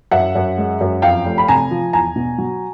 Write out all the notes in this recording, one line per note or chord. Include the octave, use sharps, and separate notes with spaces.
F#2 E5 F#5
F#2
G#3
F#2
F2 F5 G5
F1
B5
C3 G#5 A#5
F3
E2 G#5 A#5
B2
F#3